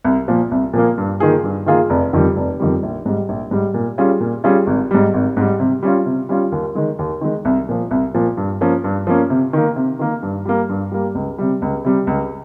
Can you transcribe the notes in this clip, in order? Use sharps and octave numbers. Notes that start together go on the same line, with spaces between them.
C2
A#2 F3 A#3
C2
A#2 F3 A#3
G2
D#3 A#3 F4 G#4
G2
D#3 A#3 F4 G#4
F1
F2 D#3 G3
F1
F2 D#3 G3
A#1
G#2 G3
A#1
G#2 G3
A#2
G3 C#4 F4 G#4
A#2
G3 C#4 F4 G#4
G#1
G#2 G3
G#1
G#2 G3
C3
G3 C#4 F4
C3
G3 C#4 F4
D#2
D#3 G#3
D#2
D#3 G#3
C2
A#2 F3
C2
A#2 F3
G2
F3 A#3 C#4
G2
F3 A#3 C#4
C3
D#3 A#3
C3
D#3 A#3
G2
G3 A#3
G2
G3 A#3
C#2
C3 G3
C#2
C3 G3
C#2